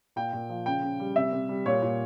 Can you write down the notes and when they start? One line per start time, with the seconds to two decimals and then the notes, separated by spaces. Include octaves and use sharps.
0.16 A#2 G5
0.33 A#2
0.50 F3
0.66 C#3 G5
0.83 C#3
1.00 G3
1.16 C3 E5
1.32 C3
1.49 G3
1.66 A#2 C#5
1.82 A#2